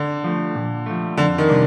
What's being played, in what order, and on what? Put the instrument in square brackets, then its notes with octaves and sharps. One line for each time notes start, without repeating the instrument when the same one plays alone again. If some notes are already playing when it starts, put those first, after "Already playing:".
Already playing: [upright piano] D3
[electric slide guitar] F3 A3
A#2
F3 A3
[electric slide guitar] F2 [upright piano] D3
[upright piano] D#3
[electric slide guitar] C3 G3 D4